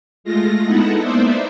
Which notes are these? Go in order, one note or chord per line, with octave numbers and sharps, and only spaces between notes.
G#3 A3 F4 A#6
G#3 B3 D#4 E4 A4 F#5
A#3 B3 D#4 C5 D5 E5